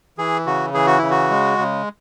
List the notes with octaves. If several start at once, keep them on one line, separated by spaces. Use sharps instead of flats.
E3 G#4
C#3 F#4
E3 G#4
F#4
C#3 E4
F#4
G#3
C#3